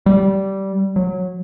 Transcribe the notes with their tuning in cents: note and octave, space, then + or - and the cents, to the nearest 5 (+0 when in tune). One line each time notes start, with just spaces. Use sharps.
G3 -15
F#3 -15